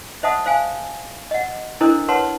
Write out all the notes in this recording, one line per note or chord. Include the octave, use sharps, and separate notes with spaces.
C5 D#5 E5 F#5 A5 D#6
C5 F5 G#5
D#5 F#5
D4 E4 A4 A#4 C5 D#5
B4 C#5 F#5 A5 C6